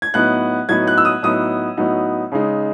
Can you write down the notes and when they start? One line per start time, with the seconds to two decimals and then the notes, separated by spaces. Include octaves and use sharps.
0.02 G#6
0.14 A2 F#3 B3 D#4 F#6
0.69 A2 F#3 B3 D#4 G#6
0.87 F#6
0.98 E6
1.05 D#6
1.23 A2 F#3 B3 D#4 D#6
1.77 A2 F#3 B3 D#4
2.32 C#3 G#3 D#4